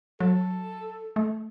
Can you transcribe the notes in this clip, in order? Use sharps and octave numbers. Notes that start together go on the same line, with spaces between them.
F#3 A4
A3